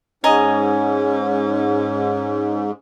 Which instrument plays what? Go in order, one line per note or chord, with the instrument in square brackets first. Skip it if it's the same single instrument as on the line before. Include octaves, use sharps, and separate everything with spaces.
[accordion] G#2 [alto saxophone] C#4 [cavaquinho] D#5 G#5 A#5